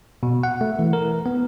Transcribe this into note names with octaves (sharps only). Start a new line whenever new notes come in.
B2
F#5
A3
E3
A#4
B3